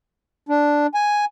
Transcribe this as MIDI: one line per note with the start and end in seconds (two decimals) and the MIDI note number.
0.49 0.87 62
0.94 1.25 80